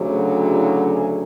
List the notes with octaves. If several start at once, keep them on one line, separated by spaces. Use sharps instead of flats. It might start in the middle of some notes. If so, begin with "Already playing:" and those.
Already playing: D2 C#3 F#3
E4
G#4